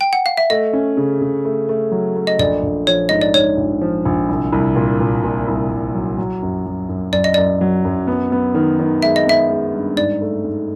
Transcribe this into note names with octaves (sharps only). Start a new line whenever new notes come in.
G5
F#5
F5
E5
A3 D#5
C#4
C#3
C#3
A3
A3
F#3
A3
D#5
A#1 D5
A#1
F3 C#5
G#2 D#5
D5
G#2 C#5
A#1
F3
A#1
C2
C2
A#2
A#2
A#2
C2
C2
F#3
F#3
F#2
F#3
F#2
F#2 D5
D#5
F#2 D5
F#3
F#2
B3
B3
D#3
D#3
G#3 E5
D#5
B3 E5
G#3
G2
G#2 D5
A3
G#2